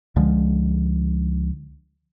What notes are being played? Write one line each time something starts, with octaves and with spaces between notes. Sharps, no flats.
C#2 D3 F3 G#3